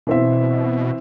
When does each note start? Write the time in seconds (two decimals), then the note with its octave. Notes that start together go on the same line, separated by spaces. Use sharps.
0.07 B2 E3 C4 E5